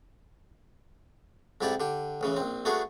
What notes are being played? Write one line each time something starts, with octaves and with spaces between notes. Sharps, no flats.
F2 G#2 E4 G4 D5
D3 G4
A1 C#3 E3
A#1 C4
A3 B3 D4 F#4 G#4